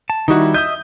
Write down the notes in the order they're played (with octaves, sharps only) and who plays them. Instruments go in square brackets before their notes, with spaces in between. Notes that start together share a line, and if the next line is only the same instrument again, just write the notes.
[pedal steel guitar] A5
[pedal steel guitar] D#3 G3 E4 [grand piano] D#4 F#4
[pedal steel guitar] D#5 E5 D#6 [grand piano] G6